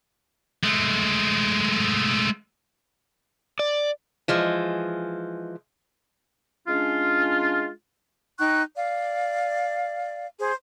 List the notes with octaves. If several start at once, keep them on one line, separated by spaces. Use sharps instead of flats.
G#3 A3
D5
E3 F3 G#3
G#3 C#4 D4 F4
D#4 G5 C#6 F#6
D5 F5
G#4 C5